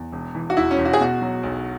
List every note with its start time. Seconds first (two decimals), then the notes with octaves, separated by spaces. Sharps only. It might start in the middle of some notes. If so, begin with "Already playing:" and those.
Already playing: E2
0.12 E1
0.35 E3
0.50 F#4
0.57 E1 E4
0.71 C#4
0.78 E1
0.85 F#4
0.93 G#4
1.00 B2 F#4
1.21 F#3
1.43 B1